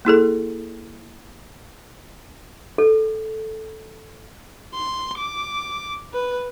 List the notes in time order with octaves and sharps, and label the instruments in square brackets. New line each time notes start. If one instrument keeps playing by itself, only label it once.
[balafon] A#3 E4 G#4 A4
[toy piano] A4
[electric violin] C6
D6
B4